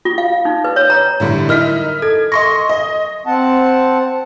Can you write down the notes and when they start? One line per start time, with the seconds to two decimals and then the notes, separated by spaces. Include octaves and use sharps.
0.05 F4
0.18 F5
0.45 D#4
0.64 B4
0.76 C#5
0.90 A#5
1.20 A2 D3 G3
1.49 D#4 E4 A#4 F6 B6
2.02 A4 G#6
2.32 D#5 C6 C#6 A#6
2.69 D#5
3.27 C4 F#5 A5